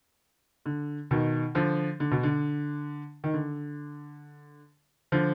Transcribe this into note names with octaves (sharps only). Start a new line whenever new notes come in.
D3
B2 D#3
D3 F3
D3
B2
D3
D#3
D3
D3 F3